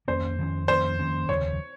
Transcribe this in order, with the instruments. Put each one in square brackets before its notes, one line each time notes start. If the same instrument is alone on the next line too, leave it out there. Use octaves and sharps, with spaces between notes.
[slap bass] F2 D#3 A#3 C#4 [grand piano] C5
[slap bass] F2 D#3 A#3 C#4
[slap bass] F2 D#3 A#3 C#4 [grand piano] C5
[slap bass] F2 D#3 A#3 C#4
[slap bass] F1 D#2 C#3 F3 [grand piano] C#5